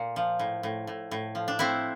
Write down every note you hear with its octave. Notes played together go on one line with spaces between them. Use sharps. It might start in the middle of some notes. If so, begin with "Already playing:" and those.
Already playing: A#2
F3
A2
A2
A2
A2
F3
D4
A3 C4 E4